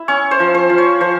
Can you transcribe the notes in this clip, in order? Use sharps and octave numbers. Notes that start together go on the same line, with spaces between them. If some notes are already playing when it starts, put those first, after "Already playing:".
Already playing: E4
C#4 C#5
C5
F3
C5
F3
C#5
F3 C5